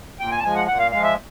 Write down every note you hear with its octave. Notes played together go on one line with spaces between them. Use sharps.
A#2 G5
G#5
A5
F3 G#3 G#5
F#5
A#2 F#5
F5
G#3 F5
F3
E5